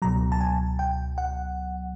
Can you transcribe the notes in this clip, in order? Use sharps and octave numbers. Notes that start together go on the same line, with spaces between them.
C#2 B2 F#3 A#5
A5
G#5
G5
F#5